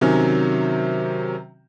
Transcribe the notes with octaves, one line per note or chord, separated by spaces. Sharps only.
C3 D#3 F#3 C#4